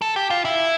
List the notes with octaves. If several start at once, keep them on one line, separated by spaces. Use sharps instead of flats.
A4
G4
F4
E4